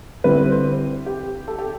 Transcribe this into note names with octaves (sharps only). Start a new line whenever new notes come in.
D3 G3 C4 E4 B4
C5
G4
A4
G4